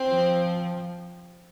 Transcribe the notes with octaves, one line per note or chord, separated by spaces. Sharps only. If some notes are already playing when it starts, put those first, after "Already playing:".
Already playing: C4
F3